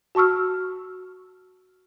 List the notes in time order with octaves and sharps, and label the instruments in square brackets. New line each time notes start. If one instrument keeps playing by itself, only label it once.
[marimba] F#4 A5 C#6 E6 F6